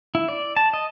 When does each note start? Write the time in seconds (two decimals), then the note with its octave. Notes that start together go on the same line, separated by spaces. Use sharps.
0.15 E4
0.29 D5
0.56 A5
0.73 D#5